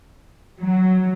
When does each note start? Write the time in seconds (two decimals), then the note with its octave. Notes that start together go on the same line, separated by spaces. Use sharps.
0.60 F#3